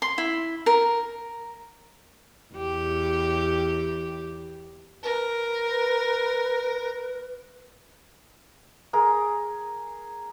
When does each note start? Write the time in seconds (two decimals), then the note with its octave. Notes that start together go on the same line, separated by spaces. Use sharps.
0.02 C6
0.18 E4
0.66 A#4
2.54 E2 G4
5.03 A#4 B4
8.93 G#4 A#4